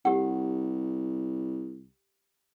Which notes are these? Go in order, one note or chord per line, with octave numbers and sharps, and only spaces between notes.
C2 G4 F#5